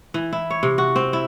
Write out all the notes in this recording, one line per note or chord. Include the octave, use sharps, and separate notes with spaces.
E3
E4
C#5
C3
F#4
C4
E4